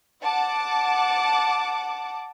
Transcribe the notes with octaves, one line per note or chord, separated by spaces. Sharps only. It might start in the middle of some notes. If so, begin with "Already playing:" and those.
F#5 A5 D6